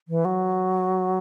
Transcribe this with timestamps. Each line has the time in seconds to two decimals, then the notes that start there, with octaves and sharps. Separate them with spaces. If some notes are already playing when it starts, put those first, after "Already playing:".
0.08 E3
0.25 F#3